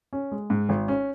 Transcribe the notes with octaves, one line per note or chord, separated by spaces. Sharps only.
C#4
G#3
G#2
G#1
C#4